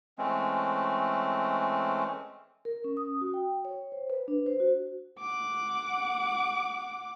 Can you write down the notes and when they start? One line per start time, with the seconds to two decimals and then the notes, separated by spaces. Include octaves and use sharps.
0.18 E3 G#3 A3 C4 C#4
2.65 A#4
2.84 C#4
2.97 D#6
3.21 F#4
3.34 G5
3.65 C#5
3.92 C5
4.10 B4
4.28 D4
4.46 C5
4.60 F#4
5.20 F#5 D6